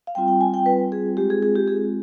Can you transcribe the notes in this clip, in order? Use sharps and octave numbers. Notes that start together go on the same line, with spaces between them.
F5
G3 C4 F4 G5
G5
G#5
G5
B4
G#4
G#3 C4 F4 G4
G#4
G#4
G4
G#4